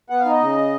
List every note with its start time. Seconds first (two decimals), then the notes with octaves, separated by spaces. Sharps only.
0.10 B3 F#5
0.20 F5
0.25 D#4
0.31 D#5
0.41 C#3